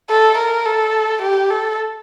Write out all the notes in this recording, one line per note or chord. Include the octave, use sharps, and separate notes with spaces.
A4
A#4
A4
G4
A4